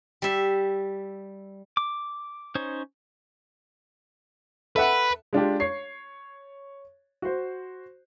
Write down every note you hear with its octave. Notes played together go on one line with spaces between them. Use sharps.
G3 E5
D6
C#4 D#4 C5 C#5
A4 B4 E5 F#5
G#3 D4 F4 G4
C#5 C7
F#4 C5